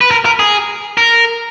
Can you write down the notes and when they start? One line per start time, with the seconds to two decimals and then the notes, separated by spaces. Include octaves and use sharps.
0.01 B4
0.11 A#4
0.25 A#4
0.39 G#4
0.97 A#4